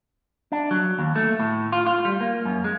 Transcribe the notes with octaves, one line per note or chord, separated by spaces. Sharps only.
D4
F#3
D#2
A3
A2
F4
F4
G3
A#3
F#2
G#3